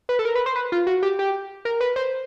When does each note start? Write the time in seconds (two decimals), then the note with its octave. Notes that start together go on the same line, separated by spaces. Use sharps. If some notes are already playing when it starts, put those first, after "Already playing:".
0.09 B4
0.19 A4
0.25 A#4
0.35 B4
0.46 C5
0.56 B4
0.72 F4
0.87 F#4
1.03 G4
1.19 G4
1.65 A#4
1.81 B4
1.96 C5